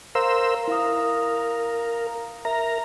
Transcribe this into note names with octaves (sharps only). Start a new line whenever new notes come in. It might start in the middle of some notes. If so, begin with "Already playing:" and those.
A#4 C5 F5 E6
E4 A#4 F5 D#6
A#4 E5 A#5